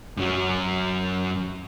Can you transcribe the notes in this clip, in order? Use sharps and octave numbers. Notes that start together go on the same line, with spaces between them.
F#2 F#3